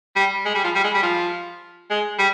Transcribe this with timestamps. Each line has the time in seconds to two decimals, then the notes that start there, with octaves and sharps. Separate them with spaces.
0.16 G3
0.45 G#3
0.54 G3
0.64 F3
0.75 G3
0.84 G#3
0.94 G3
1.02 F3
1.90 G#3
2.18 G3